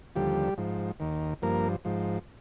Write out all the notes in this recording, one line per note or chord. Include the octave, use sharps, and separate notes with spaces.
D#2 D3 F3 G3 G4
G#2 F3
D#2 D#3
G2 F3 A#3 A#4
G#2 F3